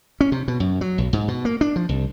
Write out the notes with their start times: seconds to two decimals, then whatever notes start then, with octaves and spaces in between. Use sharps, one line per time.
0.21 C#4
0.32 C3
0.48 B2
0.60 F#2
0.81 F#3
0.98 B1
1.13 G#2
1.28 B2
1.45 A#3
1.61 D4
1.76 F3
1.89 C2